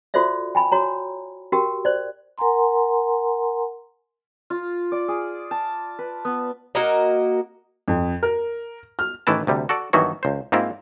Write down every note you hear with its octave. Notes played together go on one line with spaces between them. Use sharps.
F4 F#4 A4 C5 D5 E5
G5 G#5 B5
F#4 C#5 A#5
F#4 G4 A#4 G5
C5 D5
A#4 F#5 G#5 A#5 C6
F4
D5
G#4
A5
B4
B3
A#3 F#4 A#4 D#5
F2
A#4
F6
A1 D#3 E3 E4 B4 A5
D2 C3 G3
F#4 A4 D5
G2 D#3 E3 F#3 B3 F#4
C#2 C5
G#2 A#3 C4 E4 F4